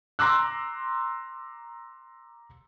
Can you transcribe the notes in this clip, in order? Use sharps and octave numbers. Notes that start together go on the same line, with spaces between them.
A#5 C6 D6 E6 F#6